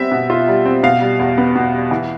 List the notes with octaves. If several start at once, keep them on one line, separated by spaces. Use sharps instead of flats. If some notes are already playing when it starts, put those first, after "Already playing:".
Already playing: G3 B3 C4 E5
B2
F4
G3
C4
B2 F5
G3
E2
B3
B2
G3
E3